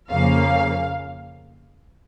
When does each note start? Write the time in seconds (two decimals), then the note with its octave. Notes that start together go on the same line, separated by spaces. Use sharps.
0.10 F2 C#3 F3 A#3 F5